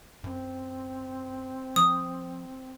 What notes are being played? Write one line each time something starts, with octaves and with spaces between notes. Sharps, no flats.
F#2 C4
F3 D#6